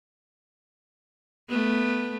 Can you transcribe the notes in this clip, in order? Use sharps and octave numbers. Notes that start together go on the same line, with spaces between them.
A3 B3